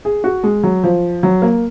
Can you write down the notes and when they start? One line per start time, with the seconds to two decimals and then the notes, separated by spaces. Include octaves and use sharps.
0.05 G#4
0.24 F#4
0.43 G#3
0.63 F#3
0.83 F3
1.23 F#3
1.42 A#3